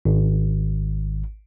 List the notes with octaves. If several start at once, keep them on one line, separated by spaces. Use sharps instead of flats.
G#1